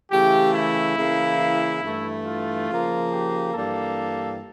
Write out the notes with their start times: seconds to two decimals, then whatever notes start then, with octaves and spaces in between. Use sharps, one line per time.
0.11 C#3 E3 A3 G4
0.54 E4
0.97 C#3 E3 A#3
1.83 G2 E3 A3
2.25 F4
2.68 C#3 F3 A#3
3.12 G4
3.54 G2 E3 G3 A#3 A4